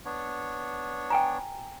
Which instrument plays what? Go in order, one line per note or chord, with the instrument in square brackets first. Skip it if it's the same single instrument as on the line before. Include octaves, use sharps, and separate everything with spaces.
[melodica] B3 D4 C#5
[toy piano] G5 G#5 A#5